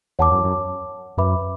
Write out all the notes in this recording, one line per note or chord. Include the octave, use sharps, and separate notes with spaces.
E2 C#5 F#5 A5 D6
F#2
F#2
F#2 B4 E5 B5 D6